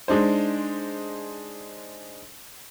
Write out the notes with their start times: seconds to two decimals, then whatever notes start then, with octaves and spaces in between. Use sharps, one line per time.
0.08 G#3 D4 D#4 C5